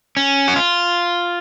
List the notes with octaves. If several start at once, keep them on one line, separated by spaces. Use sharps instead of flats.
C#4
F#4
F4